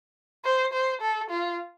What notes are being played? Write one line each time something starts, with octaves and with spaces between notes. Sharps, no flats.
C5
C5
A4
F4